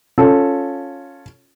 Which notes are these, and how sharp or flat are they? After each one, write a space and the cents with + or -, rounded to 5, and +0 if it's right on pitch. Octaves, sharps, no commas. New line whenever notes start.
C#4 +0 F4 +10 A4 +0